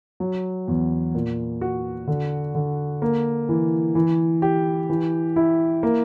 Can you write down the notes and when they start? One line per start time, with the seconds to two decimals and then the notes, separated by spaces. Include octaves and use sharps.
0.20 F#3
0.68 E2
1.15 A#2
1.61 F#4
2.07 D3
2.55 D3
3.02 A#3
3.49 E3
3.95 E3
4.42 G4
4.90 E3
5.36 E4
5.83 A#3